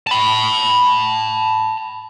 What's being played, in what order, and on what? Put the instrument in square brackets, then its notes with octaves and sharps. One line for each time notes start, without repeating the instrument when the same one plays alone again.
[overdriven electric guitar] A5 B5